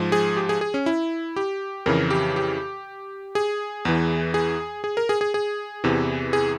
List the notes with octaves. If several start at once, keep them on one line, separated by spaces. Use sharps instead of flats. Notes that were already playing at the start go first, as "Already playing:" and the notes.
Already playing: G#2 F3
G#4
G4
G#4
G#4
C#4
E4
G4
F2 C#3 E3 A#4
G4
G4
G#4
E2 E3
G#4
G#4
A#4
G#4
G#4
G#4
E2 C3 E3
G#4